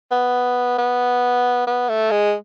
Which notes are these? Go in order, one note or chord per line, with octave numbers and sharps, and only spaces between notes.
B3
B3
B3
A3
G#3